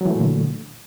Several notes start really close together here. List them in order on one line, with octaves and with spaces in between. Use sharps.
F#3 E3 A3 A#2 D3